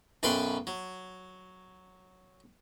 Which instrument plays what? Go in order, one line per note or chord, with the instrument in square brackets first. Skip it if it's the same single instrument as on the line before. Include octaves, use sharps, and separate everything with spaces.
[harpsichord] B1 F#2 B4 G5 B5 C6
F#3